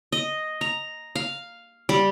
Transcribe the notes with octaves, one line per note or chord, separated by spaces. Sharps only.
D#5
A#5
F5
G3